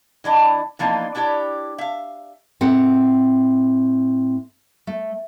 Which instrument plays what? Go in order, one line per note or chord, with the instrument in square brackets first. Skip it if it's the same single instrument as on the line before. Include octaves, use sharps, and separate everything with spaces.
[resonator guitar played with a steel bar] E3 D4 E4 D#5
E3 F3 A#3 B3 D4 D#4
D4 E4 G4 C#5 D5
E5 F5
[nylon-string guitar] A2 C4 A4 F#5
A3